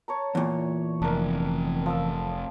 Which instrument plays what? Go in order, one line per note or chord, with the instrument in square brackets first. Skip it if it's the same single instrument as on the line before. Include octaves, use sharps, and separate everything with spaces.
[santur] C#5 A5 A#5
[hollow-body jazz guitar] E2 A#2
[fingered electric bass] F1 [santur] D4 A#4
[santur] F3 A5 E6